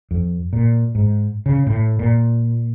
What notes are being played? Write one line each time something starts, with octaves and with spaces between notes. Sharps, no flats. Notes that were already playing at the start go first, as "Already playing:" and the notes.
F2
A#2
G#2
C#3
A2
A#2